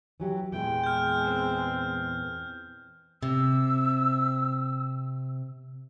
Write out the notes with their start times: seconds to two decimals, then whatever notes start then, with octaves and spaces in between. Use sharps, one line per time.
0.20 E3 F#3 G4
0.52 E2 A#2 E3 G#3 G5
0.84 F6 G6
1.23 C4
3.23 C3 E6